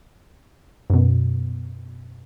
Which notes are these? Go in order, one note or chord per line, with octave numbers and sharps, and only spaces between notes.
F#2 B2